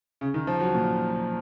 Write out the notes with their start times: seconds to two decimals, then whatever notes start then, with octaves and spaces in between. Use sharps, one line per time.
0.21 C#3
0.34 D#3
0.47 F3
0.60 F#3
0.75 A#2